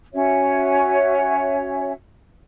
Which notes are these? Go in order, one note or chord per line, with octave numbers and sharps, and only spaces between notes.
C#4 F#4 C#5 E5